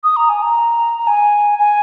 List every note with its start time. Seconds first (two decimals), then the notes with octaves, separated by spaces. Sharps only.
0.04 D#6
0.17 A#5
0.29 G#5
0.42 A#5
0.98 A#5
1.07 G#5
1.59 G#5